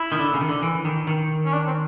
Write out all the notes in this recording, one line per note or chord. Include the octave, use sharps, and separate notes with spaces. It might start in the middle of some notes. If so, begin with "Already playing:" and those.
Already playing: E4
D#3
D3
C#3
D#3
D3
E3
D#3
D#3
C#4
D4
C4